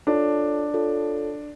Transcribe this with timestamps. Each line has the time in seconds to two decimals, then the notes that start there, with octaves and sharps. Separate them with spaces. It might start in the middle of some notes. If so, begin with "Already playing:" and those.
0.07 D4 F4 A4 C#5
0.74 F4 A4 C#5